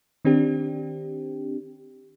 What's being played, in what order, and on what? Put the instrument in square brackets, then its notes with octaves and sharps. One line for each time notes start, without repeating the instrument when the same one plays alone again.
[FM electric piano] D#3 C4 D4 G4